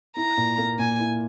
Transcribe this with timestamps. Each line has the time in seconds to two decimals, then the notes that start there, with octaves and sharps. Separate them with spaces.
0.16 E4 A#5
0.37 A#2
0.58 A#3
0.79 A#2 G#5
0.99 E4